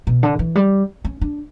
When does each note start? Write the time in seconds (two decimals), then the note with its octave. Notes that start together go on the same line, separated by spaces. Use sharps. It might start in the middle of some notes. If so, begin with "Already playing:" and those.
0.07 B2
0.23 D3
0.39 E3
0.55 G3
1.05 C#4
1.21 D4